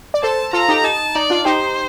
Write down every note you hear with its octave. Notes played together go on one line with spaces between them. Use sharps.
D5
A4 C5 A5
F4 A4 A#5
D#4 G4
D#4 A5
D#4 D5
D4 F4
D#4 G4 C5